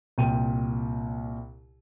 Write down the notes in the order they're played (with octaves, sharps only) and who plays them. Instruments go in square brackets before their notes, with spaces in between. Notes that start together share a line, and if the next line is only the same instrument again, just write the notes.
[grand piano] C2 A#2 G5 D#7